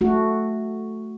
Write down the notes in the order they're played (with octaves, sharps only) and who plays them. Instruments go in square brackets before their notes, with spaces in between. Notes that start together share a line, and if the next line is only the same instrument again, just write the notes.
[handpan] A3 F#4